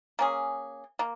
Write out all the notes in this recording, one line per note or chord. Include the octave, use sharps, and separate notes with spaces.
A#3 C#4 G#4
A#3